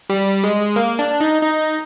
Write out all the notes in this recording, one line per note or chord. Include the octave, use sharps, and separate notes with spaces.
G3
G#3
A#3
D4
D#4
D#4